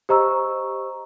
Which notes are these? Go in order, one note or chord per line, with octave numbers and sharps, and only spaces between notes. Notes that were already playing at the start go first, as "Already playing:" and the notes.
G4 C5 D#5 A#5 C#6 E6